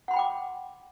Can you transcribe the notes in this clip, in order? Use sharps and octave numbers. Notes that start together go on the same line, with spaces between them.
F#5 G5 B5 C6 D6